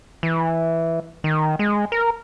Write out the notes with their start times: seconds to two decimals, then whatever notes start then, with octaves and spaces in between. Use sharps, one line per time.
0.23 E3
1.24 D#3
1.59 G#3
1.92 A#4